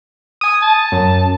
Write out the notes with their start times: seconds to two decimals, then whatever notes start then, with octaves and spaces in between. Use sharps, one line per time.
0.41 G#5 D#6
0.62 A5
0.92 F#2